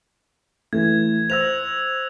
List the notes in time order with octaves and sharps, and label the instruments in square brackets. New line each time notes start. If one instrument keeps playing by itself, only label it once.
[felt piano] E3 A3 [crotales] G#6
[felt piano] C5 A#6 [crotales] E6 F#6 F7